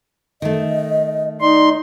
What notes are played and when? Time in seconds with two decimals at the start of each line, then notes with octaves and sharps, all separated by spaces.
0.42 D#3 A3 D#5
1.41 D#4 D5 C6